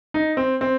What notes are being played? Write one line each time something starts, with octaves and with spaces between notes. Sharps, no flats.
D#4
C4
C4